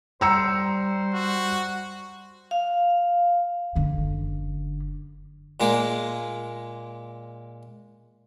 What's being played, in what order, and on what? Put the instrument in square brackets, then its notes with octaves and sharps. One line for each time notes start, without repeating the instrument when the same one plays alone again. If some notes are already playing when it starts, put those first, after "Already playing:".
[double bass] G3 [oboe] C5 [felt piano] A#5 E6 C#7
[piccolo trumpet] F#4
[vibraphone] F5
[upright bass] F#1 D3
[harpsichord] A#2 G#3 A#3